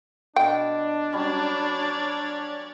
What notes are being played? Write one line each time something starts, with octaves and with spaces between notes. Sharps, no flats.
B2 D4 G5
F#3 G3 C#4 C#5 D5